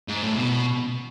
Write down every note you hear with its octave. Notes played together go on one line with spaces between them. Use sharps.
G#2
A2
B2